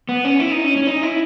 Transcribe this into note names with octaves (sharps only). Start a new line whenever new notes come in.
B3
C#4
E4
D#4
C#4
C#4
D#4
E4